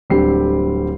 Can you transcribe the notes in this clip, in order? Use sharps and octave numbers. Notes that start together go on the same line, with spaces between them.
D1 D3 G3 C4 G4 C7